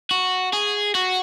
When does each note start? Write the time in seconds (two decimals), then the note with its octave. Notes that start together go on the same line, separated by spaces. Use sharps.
0.11 F#4
0.53 G#4
0.95 F#4